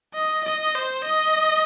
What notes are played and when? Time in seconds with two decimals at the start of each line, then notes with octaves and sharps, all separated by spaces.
0.14 D#5
0.45 D#5
0.75 C5
1.04 D#5